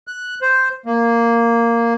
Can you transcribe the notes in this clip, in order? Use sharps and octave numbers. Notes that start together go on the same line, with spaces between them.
F#6
C5
A#3